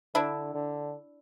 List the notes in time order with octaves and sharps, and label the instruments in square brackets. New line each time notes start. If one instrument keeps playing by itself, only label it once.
[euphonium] D3 [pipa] D4 E4
[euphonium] D3